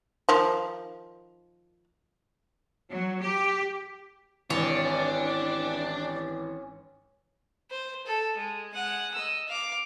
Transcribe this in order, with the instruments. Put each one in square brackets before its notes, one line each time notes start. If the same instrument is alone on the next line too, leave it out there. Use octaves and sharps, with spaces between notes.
[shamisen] D#3 F3
[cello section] F#3
G4
[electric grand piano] G#1 E3 [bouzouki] C#4 [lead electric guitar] D4 [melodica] G4 D5
[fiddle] C5
A4
G#3
G#3 F#5
D#5 E6
F5 D6